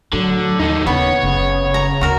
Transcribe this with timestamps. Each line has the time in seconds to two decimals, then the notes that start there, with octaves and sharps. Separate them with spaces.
0.13 A2 D3 F#3
0.59 D#2 D3 D#4
0.87 C#3 B3 C#5
1.23 F#1 C#3
1.74 A#5
2.01 D2 F#4 A#4